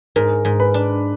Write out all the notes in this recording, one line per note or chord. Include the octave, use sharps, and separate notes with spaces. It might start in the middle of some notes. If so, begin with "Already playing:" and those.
G#2 A#4
G#2
B4
D4